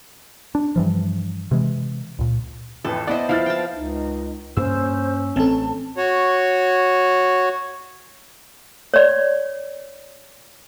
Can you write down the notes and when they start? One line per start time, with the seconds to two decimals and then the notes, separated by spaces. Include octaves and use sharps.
0.55 D4
0.76 G2 E3 F3
1.51 C3 E3 G#3
2.19 C#2 A#2
2.85 A1 F2 E3 A4
3.07 B3 E4 C5 D5 D#5
3.29 F3 E4 F5 F6 A6
3.46 G5 A5
3.74 C#2 D#4
4.57 G2 A#3 C#4 C5 E6
5.36 A1 C4 A4 A5
5.97 F#4 C#5
8.94 C#5 D5